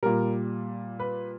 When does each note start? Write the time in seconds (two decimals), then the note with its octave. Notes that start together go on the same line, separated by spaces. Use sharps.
0.03 A#2 G3 A#4
0.99 B4